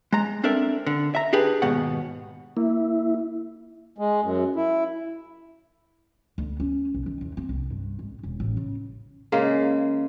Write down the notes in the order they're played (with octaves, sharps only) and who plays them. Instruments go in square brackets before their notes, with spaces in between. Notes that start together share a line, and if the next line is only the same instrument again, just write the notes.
[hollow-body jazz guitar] G#3 A#5
C4 D4 A4 A#4 E5
D3
E5 A#5
D4 G4 G#4 B4
D#2 G#2 B2 F#5
[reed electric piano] A#3 [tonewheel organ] E4
[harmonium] G#3
F#2
E4
[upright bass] D2
C#4
B1
D#3
E2
C4
C2
G2
G#1
E1
A1
C#3
[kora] C#3 G#3 A#3